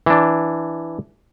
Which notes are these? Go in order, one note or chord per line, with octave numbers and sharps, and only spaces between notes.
E3 D4